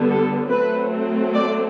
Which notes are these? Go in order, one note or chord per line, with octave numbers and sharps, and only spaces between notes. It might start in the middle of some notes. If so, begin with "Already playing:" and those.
Already playing: D3 G3 B3
A4
F#3 A3 C4 B4
D5